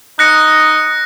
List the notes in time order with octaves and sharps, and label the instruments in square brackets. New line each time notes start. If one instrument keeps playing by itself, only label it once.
[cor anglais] D#4 [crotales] F#6 A#6 C#7